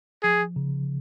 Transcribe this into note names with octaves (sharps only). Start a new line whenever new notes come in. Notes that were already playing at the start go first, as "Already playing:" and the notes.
F3 G#4
C#3